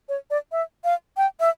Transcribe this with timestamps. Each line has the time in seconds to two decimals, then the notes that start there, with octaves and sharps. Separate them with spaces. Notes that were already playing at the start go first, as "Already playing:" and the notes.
0.09 C#5
0.30 D5
0.52 E5
0.84 F5
1.17 G5
1.40 E5